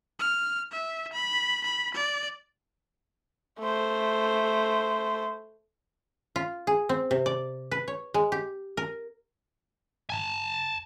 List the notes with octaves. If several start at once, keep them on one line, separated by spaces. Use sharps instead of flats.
F6
E5
B5
B5
D5
A3 C5
F4
G#4
C4
C3
D5
B4
C#5
G#3
G4
A#4
G#5 A5